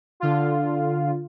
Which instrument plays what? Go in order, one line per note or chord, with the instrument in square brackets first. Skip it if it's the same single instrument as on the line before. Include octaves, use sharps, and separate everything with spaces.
[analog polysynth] D3 F4